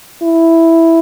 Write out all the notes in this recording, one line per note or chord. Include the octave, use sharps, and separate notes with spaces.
E4